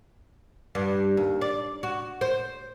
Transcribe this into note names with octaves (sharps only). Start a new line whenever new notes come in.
G2
D#2
D5
F#4
C5